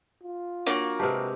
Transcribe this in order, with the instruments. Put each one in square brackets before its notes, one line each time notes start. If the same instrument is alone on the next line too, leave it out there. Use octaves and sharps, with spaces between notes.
[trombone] F4
[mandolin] A#3 F#4 [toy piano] D4 C#5 F#5
[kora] C3 G#3 G4 [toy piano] B4 F#5 A5